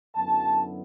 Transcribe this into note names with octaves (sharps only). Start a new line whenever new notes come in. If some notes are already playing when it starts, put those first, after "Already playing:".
F#2 D3 F#3 B3 E4 A5